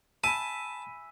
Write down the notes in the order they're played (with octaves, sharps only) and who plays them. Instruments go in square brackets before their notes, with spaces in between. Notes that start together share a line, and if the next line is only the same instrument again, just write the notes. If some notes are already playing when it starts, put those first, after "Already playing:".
[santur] E5 G#5 B5 [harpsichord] A5 [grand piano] D#7